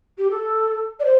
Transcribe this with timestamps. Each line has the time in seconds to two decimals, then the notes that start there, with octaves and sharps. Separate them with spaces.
0.18 G4
0.30 A4
0.99 D5
1.04 C5